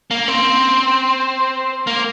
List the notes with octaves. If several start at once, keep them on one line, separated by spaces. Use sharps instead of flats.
A#3
C4
A#3